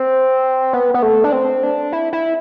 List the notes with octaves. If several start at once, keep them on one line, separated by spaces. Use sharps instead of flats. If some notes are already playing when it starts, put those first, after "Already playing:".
Already playing: C4
B3
B3
A3
D4
C4
D4
E4
E4